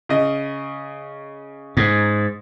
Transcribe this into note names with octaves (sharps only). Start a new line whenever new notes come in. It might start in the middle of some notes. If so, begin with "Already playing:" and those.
C#3 D#5
G#2